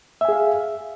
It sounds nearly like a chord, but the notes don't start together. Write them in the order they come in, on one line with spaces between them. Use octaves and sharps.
E5 G#5 G#4 F5